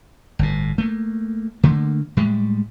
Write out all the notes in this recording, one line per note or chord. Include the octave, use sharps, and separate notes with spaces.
G1 A2
A3 A#3
D3 A3 A#3
A2 G3 G#3